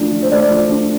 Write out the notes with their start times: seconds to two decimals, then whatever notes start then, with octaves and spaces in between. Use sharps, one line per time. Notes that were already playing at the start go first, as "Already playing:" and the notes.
Already playing: F3 A3 D4
0.12 F3
0.22 C5
0.31 A3 D5
0.51 F3
0.69 D4